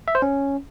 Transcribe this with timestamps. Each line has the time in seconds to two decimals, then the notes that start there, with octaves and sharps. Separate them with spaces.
0.08 E5
0.15 C5
0.22 C#4